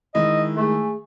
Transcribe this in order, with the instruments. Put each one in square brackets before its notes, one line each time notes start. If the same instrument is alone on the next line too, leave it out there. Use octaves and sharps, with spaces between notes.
[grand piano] D#3 G#3 E4 [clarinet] D#5
[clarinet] A3 [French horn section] G#4